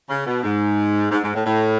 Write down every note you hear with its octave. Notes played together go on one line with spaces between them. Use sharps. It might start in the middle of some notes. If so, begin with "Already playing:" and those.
C#3
B2
G#2
G#2
G#2
A2
A2